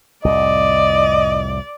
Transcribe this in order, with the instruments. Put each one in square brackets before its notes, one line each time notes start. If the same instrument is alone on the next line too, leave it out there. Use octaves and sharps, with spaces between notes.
[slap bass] C2 F2 A2 [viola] D5 [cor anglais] D#5